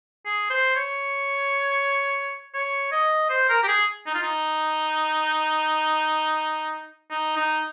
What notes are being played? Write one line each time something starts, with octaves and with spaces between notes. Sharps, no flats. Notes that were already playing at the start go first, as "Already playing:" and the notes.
G#4
C5
C#5
C#5
D#5
C5
A#4
G4
G#4
D#4
F4
D#4
D#4
D#4